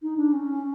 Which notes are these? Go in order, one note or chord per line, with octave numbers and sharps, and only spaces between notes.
D#4
D4
C#4